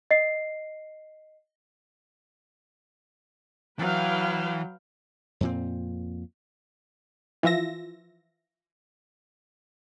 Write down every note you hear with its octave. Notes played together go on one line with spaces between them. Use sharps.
D#5 C7
E3 F#3 B4 F5 G5
F2 A#2 C4
E3 F3 F4 E5 A#6